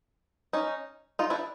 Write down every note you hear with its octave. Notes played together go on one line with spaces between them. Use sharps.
C#4 D#4
D#4 F4
D4 E4